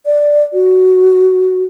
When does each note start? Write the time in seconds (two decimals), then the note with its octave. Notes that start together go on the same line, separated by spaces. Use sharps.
0.06 D5
0.53 F#4